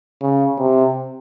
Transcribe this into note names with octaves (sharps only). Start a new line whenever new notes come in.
C#3
C3